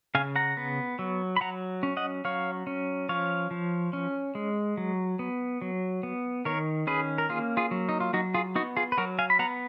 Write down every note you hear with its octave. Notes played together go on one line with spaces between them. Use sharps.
C#3 F5 G#5
F#5 A#5
B3
F#3
B5
F#3 F#5 A#5
C#4
D#5 F#5
F#3 C#5 F5
C#4
F3 C#5 F5
F3
C#4
G#3
F#3
B3
F#3
B3
D#3 A#4 C#5
C#4 G#4 B4
A#4
A#3 F4 G#4
F4 G#4
F#3
D#4
F4
F#3 D#4 F#4
F4 G#4
B3 D#4 F#4
F4 G#4
B4
F#3 F#4 A#4
F5 G#5
B5
B3 F#5 A#5